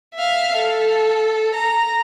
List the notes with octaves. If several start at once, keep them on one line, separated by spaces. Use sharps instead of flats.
E5 F5
A4
A#5